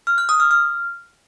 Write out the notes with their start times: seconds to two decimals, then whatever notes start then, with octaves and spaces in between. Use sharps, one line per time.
0.07 F6
0.18 F#6
0.29 D#6
0.40 F6
0.51 F6